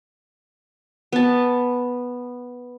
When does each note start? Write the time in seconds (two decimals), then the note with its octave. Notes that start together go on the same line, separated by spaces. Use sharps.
1.12 B3 A5